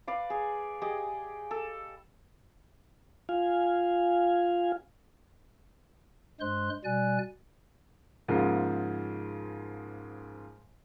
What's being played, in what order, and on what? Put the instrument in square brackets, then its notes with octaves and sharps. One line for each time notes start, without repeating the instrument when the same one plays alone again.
[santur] B4 D5 F5
G#4
G4 G#4 D5 D#5
A4
[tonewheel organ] F4 F5 G#5
[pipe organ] G2 G#3 C5 C6 F#6
B2 G3 D5 G#5 F#6
[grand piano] G#2 C#3 F3 A#3